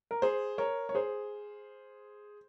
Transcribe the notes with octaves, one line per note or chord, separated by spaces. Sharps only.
A#4
G#4 C5
A#4 C#5
C#5
G#4 C5